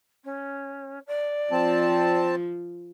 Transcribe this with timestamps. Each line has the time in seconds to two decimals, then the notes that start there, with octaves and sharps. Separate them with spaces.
0.24 C#4
1.07 D5
1.52 F3 C4 A5